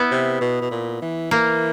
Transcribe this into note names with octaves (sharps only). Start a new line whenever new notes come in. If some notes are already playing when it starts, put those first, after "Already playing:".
Already playing: B3 E4
C3
B2
B2
A#2
E3
E3 A#3